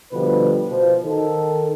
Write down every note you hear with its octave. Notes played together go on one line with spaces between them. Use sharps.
B2 D3 F3 G3 B4
B2 F3
D#3 A4